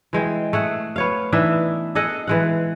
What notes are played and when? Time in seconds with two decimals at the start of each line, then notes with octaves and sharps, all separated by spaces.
0.13 E3 G#3 G5
0.53 A3 G#4 F#5
0.96 B3 C#5 F5
1.32 E3 D4 D#4 E5
1.95 G#4 A4 D#5 F#5
2.27 E3 G#3 F#5